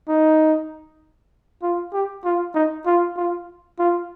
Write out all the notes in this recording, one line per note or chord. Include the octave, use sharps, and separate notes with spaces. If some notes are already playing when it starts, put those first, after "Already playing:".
D#4
F4
G4
F4
D#4
F4
F4
F4